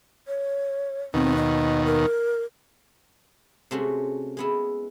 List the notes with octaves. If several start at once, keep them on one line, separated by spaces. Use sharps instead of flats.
C#5
D#2 B2 D#3 C4
D#5
A#4
C3 G#3 A3 C#4 F#4
G#3 B3 E4